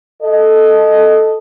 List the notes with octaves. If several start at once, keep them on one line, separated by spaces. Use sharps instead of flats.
A4 D#5